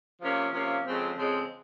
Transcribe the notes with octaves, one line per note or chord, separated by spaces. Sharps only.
C3 F3 A#3 C#4
C3 F3 A#3 C#4
F2 C#3 G#3 C4
F2 C#3 G#3 C4